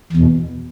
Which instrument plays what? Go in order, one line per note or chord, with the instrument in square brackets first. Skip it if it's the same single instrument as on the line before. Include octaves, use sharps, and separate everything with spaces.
[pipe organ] E2 B2